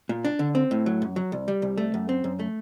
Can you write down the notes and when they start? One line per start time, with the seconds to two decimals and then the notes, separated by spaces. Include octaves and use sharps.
0.09 A#2
0.25 D4
0.39 D3
0.55 C4
0.71 A2
0.86 F#3
1.02 F#2
1.16 F#3
1.32 C2
1.48 G3
1.62 C2
1.78 A3
1.94 F#2
2.09 C4
2.24 F#2
2.40 A3